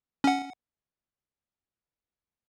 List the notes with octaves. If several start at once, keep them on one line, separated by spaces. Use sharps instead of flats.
C#4 F#5